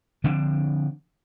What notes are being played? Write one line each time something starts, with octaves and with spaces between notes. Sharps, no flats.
D3 F3 C4 D4